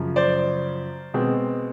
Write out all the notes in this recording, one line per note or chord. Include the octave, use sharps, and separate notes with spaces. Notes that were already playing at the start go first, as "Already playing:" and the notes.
Already playing: F#2 C#3 F3
C5 D5
B2 G#3 C4